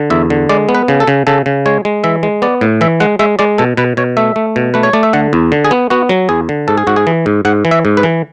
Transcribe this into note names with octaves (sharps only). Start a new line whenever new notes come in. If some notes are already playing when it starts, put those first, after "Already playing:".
Already playing: D3
E2 E5
D3
G#3 D5
B3
B4
C#3
A4
C#3
C#3 A4
C#3
G#3 C#5
G#3
E3 E5
G#3
B3 D5
A2
E3 E5
G#3 F#5
G#3 E5
G#3 D5
B2 A4
B2 B4
B2 C#5
A3 E5
A3
B2
A3 B4
C#5
A3 D5
E5
D3 F#5
E2
D3
G#4
B3
B3 F#4
F#3
E2 G#4
D3
G#2 A4
G#4
G#2 F#4
G#4
E3
G#2
G#2 F#5
E3
E5
G#2
B4
E3